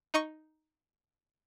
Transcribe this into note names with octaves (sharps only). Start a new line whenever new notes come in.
D#4 D#5 C#6